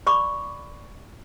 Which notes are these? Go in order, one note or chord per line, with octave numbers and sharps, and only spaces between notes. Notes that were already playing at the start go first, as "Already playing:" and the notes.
D5 B5 C#6 D6